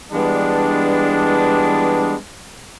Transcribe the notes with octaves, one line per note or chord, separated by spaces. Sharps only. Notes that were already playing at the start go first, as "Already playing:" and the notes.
E3 G3 G#3 B3 D4